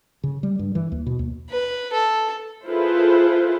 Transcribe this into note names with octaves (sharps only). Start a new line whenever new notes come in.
C#3
G3
G2
E3
D#2
B2
D#2
B4
A4
E4 F4 G#4 A4 B4 C5